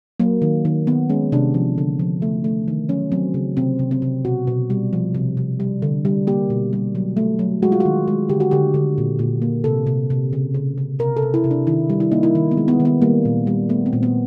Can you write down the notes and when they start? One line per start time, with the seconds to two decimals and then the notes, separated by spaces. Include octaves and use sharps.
0.20 F#3 A#3
0.42 D#3
0.65 D#3
0.87 D#3 B3
1.09 G#3 C#4
1.32 C3 D4
1.54 F3
1.78 D3
1.99 F3
2.22 A3
2.44 A3
2.68 D#3
2.89 F#3 C#4
3.12 F#3 C4
3.34 C#3
3.57 C3 C4
3.79 C3
3.91 C4
4.02 C3
4.25 B2 F#4
4.47 B2
4.70 G3
4.93 F3
5.15 C3
5.37 C3
5.60 G3
5.82 D3
6.05 G3
6.27 A#3 G4
6.50 B2
6.73 G3
6.95 F#3
7.17 A3
7.39 F#3
7.62 G#3 F#4
7.72 F4
7.80 D#3 F#4
8.08 G#3
8.29 D3 G4
8.40 F#4
8.51 D3 G4
8.74 D3
8.98 A#2
9.19 A#2
9.42 A#3
9.64 C3 A4
9.87 C3
10.10 C3
10.33 C#3
10.54 C#3
10.78 C#3
10.99 C3 A#4
11.17 A4
11.22 C3
11.34 E4
11.44 C3
11.51 D4
11.67 D#3 E4
11.90 G3
12.00 E4
12.12 A#3 D#4
12.23 E4
12.35 D#3 D#4
12.51 B3
12.57 G#3
12.68 B3
12.80 D#3
12.85 B3
13.02 G3 A#3
13.25 A#2
13.47 G3
13.69 A3 B3
13.86 C4
13.93 A#2
14.03 B3